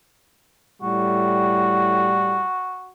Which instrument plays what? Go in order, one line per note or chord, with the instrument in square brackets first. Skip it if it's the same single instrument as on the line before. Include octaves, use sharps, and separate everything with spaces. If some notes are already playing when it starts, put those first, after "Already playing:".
[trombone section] A2 G3 [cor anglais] F#4